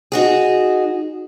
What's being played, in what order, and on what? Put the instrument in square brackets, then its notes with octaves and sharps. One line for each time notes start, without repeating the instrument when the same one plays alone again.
[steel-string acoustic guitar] D#4 F#4 G#4